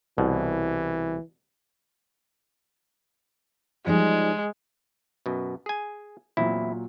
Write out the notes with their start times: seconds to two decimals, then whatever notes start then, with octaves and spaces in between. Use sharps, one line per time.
0.18 C2 B2 E3
3.87 F3 G3 G#3 D#4
5.26 F#2 B2
5.66 G#4 G#5
6.37 E2 A#2 F#3 C4 E4